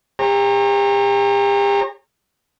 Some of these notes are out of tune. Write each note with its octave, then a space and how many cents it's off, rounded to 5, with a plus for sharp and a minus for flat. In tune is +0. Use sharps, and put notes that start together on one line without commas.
G4 +40 C#5 -35 A#5 -20